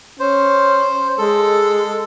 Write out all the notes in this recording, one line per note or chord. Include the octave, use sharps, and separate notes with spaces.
C#4 C5
G#3 A4